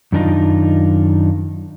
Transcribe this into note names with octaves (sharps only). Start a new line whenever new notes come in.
F#2 D#3 D4 D#4 F4